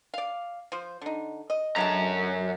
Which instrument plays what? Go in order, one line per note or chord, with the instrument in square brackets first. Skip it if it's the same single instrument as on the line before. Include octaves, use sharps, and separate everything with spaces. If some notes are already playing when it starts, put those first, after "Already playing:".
[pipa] D5 F5
F3 C5
D3 D#4
D#5
[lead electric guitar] F#2 A#5 [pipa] D3 G#3 A5